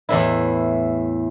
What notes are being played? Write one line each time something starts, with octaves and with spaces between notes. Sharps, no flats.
E2 A2 E4